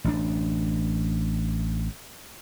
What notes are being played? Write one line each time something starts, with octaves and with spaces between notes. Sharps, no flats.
A1 D4